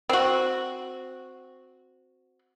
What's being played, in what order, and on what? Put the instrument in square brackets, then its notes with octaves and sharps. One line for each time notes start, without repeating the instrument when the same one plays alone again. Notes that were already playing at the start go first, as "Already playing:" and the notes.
[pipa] C4 F#4